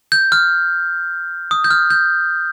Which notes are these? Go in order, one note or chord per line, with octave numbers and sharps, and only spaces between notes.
G6
F6
D#6
G6
F6
G6